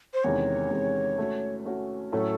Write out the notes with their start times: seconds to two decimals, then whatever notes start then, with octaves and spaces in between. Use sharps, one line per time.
0.14 C5
0.24 E2 C3 D#3 G#3 C#4 C#5
0.71 E2 C3 D#3 G#3 C#4
1.18 A3 C#4 F#4
1.65 A3 C#4 F#4
2.12 A2 F#3 A3 C#4 A4